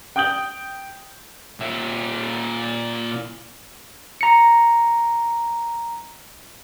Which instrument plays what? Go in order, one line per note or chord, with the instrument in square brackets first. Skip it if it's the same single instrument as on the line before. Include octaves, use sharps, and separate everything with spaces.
[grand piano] G5 D#6 G6 G7
[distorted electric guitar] A#2 E5
[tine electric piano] A#5 C#7